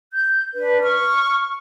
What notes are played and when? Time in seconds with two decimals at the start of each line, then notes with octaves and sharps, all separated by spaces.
0.13 G6
0.55 D4 B4
0.82 C#6 F6